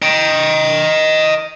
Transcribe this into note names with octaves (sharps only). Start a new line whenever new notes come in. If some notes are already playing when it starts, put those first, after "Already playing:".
D#5 G5